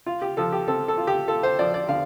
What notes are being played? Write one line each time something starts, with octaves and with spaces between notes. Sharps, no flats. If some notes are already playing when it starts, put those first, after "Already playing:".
F4
G4
F3 A4
G4
C4 A4
A4
F4
G4
F4 A4
C5
F3 D5
D5
D3 F5